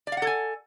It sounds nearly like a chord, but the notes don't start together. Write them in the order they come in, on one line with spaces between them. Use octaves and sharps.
D5 F5 F#5 A4 G#5